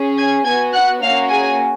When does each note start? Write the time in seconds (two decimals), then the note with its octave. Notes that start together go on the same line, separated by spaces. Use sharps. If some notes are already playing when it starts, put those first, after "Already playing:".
Already playing: C#4 G#4
0.18 G#5 G#6
0.45 B3 F#4 G#5 G#6
0.73 F#5 F#6
1.02 A#3 C#4 F#4 F5 F6
1.29 G#4 G#5